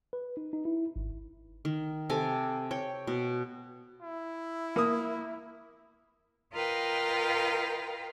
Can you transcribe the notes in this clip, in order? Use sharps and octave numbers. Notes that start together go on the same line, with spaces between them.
B4
D#4
D#4
E4
G#1
D#3
C3 A4 G#5 D6
C#5 G5
B2
E4
A#3 D#6
F4 A#4 B4 D#5 F5 G5